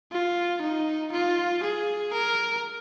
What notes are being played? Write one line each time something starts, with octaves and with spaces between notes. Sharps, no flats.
F4
D#4
F4
G#4
A#4